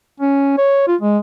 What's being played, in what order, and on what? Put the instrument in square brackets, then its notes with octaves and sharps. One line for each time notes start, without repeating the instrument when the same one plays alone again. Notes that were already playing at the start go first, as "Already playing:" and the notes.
[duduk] C#4
C#5
F4
G#3